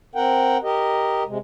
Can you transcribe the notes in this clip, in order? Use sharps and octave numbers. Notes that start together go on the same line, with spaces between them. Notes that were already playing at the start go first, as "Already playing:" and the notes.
C4 A#4 F#5 G5
G4 A#4 D#5
C3 G#3